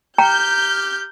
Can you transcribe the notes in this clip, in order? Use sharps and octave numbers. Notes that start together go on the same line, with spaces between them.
G4 G5 A#5 F6 G6 C#7 D#7